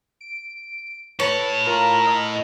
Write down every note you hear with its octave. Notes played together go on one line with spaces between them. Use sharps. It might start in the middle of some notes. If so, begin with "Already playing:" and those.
D7
A2 B4 C#5 A5
F4 A#4
D#5